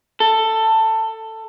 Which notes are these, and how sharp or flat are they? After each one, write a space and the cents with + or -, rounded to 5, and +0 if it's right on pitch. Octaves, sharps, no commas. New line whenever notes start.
A4 +15